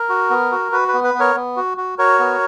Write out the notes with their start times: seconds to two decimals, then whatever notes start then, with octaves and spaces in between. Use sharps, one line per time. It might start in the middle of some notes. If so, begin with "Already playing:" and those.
Already playing: A#4
0.09 F#4
0.30 B3
0.52 F#4
0.72 F#4 B4
0.88 B4
0.94 B3
1.04 B4
1.14 B3
1.19 A#4 C#5
1.35 B3
1.57 F#4
1.78 F#4
1.98 F#4 A#4 C#5
2.19 B3